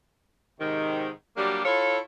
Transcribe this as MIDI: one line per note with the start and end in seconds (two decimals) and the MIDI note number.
0.60 1.09 44
0.60 1.09 48
0.60 1.09 51
1.37 1.61 54
1.37 1.61 55
1.37 1.61 58
1.37 1.61 62
1.37 1.61 67
1.65 1.98 64
1.65 1.98 65
1.65 1.98 69
1.65 1.98 73